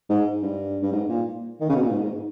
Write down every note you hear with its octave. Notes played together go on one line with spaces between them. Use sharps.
G#2
G2
G2
G#2
A#2
D#3
C#3
B2
A#2
G#2
G#2